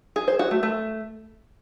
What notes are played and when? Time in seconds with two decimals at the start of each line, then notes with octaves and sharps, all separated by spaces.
0.16 G#4
0.28 C5
0.39 F#4
0.51 A3
0.63 A3